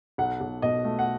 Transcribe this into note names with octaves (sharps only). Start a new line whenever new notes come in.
B1 F#5
B1
B2 D#5
A3
F#5